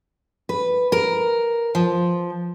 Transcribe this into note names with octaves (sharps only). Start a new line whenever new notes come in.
B4
A#4
F3